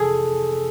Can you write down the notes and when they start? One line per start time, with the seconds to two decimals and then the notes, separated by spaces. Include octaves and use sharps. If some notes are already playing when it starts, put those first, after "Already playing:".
Already playing: F2 C3 E3 G#4 A4